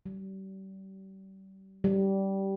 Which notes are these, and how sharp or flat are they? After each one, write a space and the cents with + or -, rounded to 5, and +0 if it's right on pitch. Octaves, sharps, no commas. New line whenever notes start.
G3 -35
G3 -15